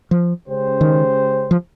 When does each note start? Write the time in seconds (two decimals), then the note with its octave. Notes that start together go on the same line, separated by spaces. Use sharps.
0.11 F3
0.46 C#3 G#3 C#4 G4 C5
0.81 D#3
1.51 F3